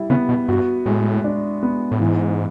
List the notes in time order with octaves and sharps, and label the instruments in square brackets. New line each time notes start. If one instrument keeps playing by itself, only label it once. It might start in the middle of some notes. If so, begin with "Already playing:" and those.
Already playing: [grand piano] G3 E4
[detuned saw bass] C#3 [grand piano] B3
[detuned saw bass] B2
[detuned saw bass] G2 [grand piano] F#4
[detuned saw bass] A2 [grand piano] G#3
[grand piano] D4
B3
[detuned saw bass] A2
[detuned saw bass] G#2 [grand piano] E3